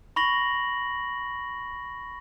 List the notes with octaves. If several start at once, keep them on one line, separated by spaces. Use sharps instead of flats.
B5 C#6 A#6 F#7